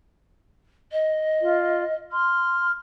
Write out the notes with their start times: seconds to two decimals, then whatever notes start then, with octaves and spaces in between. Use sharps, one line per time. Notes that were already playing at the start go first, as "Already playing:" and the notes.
0.92 D#5
1.41 F4
2.12 C6 F6